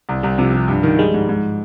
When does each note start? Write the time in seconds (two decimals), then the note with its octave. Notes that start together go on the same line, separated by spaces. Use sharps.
0.09 C2
0.23 C2 G3
0.38 C3 F3
0.53 C3
0.68 G2
0.83 D#3
0.98 G3 G#3
1.14 G#2
1.29 G#2